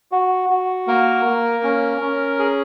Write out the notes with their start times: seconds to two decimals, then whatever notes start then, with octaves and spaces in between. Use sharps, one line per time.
0.12 F#4
0.50 F#4
0.88 A#3 A#4
1.26 A#3
1.63 C#4
2.01 C#4
2.39 G#4